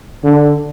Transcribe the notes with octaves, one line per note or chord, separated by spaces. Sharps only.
D3